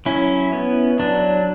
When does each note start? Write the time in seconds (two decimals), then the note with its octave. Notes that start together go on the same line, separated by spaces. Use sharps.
0.06 F#3 C#4 E4
0.53 B3
0.99 F#3 D4